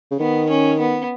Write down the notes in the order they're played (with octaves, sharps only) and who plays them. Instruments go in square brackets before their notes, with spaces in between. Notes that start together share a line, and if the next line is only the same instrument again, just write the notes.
[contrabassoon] C#3
[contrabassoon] D#3 [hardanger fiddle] B3
[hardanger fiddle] C#4
B3